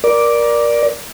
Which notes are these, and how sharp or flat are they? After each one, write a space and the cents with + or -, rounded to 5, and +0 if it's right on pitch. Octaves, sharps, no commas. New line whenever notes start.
A#4 +25 D5 +0